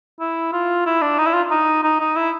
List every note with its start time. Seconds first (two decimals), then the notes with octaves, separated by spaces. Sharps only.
0.20 E4
0.53 F4
0.86 E4
1.01 D4
1.18 D#4
1.26 E4
1.34 F4
1.51 D#4
1.83 D#4
2.00 D#4
2.16 E4